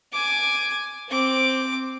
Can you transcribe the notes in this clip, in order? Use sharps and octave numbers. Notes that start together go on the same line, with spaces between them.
G#5 D6
C4 D6